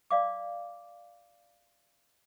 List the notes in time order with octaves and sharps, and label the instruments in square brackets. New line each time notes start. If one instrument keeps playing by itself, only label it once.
[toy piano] D5 F5 D6